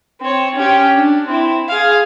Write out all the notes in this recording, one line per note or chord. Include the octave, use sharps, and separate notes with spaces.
C4 C#5
C#4 G4
D4
C4 E4
G#4 F5